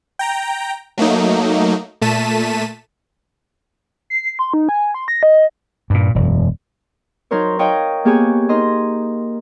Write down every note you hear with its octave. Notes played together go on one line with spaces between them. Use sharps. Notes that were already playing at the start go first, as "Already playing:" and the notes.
G5 A#5
F#3 A3 A#3 D#4
A#2 A3 A5 B6 D#7 E7
C7
C6
D#4
G#5
C6
A#6
D#5
G2 A#2
E1 F#2
F#3 D#4 A#4 C5 C#5
D#4 C#5 D#5 F5 G5
A#3 B3 G4 G#4 C#5 G#5
D#4 A#4 D#5 C6